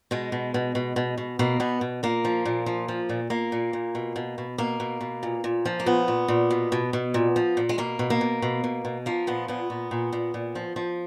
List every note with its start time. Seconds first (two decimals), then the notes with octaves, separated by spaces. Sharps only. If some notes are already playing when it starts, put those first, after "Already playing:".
0.11 B2 G#3
0.32 B2
0.54 B2
0.75 B2
0.96 B2
1.18 B2
1.39 B2 A#3
1.60 B2 B3
1.81 B2
2.03 A#2 A#3
2.25 F3
2.46 A#2
2.66 F3
2.88 F3
3.09 A#2
3.30 A#2 A#3
3.52 A#2
3.73 A#2
3.95 B2
4.16 B2
4.38 B2
4.58 B2 A#3
4.80 B2
5.01 B2
5.23 A#2
5.44 A#2
5.65 F3
5.80 A#3
5.86 A#2 B3
6.08 A#2
6.28 A#2
6.51 B2
6.72 B2
6.93 B2
7.14 A#2
7.36 F3
7.57 A#2
7.69 G#3
7.78 B2 A#3
7.99 B2
8.10 A#3
8.21 B2
8.42 B2
8.64 B2
8.85 B2
9.06 F3 A#3
9.27 A#2 B3
9.48 A#2 B3
9.70 A#2
9.91 A#2
10.13 A#2
10.34 A#2
10.55 F3
10.76 F3